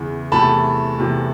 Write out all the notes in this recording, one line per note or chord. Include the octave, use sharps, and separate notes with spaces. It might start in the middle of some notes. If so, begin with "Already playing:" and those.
Already playing: E2 C#3 E3
E2 C3 E3 A3 A5 B5
E2 C3 E3 A3